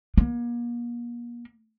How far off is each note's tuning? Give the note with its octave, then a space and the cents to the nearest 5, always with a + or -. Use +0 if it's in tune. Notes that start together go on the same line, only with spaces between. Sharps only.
A#3 +40